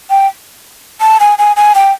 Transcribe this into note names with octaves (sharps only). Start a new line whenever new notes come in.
G5
A5
G#5
G#5
G#5
G5